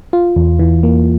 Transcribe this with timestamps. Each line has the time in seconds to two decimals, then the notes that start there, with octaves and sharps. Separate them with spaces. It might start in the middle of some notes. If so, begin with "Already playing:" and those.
0.13 F4
0.36 E2
0.59 E3
0.83 A#3